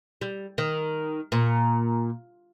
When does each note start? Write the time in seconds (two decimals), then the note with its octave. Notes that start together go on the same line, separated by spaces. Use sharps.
0.21 G3
0.58 D#3
1.32 A#2